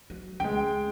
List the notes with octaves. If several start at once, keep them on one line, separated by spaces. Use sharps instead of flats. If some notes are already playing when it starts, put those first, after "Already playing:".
F#3
C#2 G#3 G5